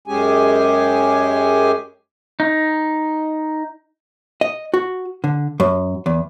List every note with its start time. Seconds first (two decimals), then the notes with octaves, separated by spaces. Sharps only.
0.08 F#2 G#3 C#4 G4 G#4 G#5
2.40 D#4
4.41 D#5
4.74 F#4
5.24 D3
5.60 F#2
6.06 E2